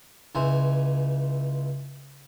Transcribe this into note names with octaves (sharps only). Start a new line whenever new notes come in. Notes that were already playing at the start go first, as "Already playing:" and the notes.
C#2 E3 C5 G#5